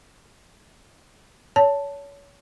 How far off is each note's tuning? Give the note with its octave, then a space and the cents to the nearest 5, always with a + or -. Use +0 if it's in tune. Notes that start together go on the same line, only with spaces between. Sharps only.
C#5 +30 A5 +0